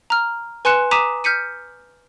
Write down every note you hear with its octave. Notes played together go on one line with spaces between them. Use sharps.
A#5 F6
B4 G#5 C6 F#6 C#7 E7
A#5 D6 D#6 B6 D#7 E7
F6 G6 B6 C#7 D#7